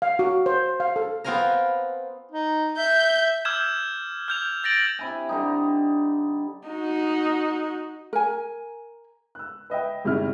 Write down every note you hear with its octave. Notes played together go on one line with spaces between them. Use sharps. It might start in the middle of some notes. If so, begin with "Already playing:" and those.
F5
F#4
C5
F5
A4
B3 C4 F4 A#4 G#5 A#5
D#4
E5 G6
D6 E6 F6 G6 G#6 E7
F6 G6 F7
G6 A6 A#6 D7 F#7
C3 E4 G#5
D3 G3 D#4
D#4 F#4
A#4 G#5
E6 F#6
B4 D#5 E5 G5
G1 G#2 C3 G3 E4 F6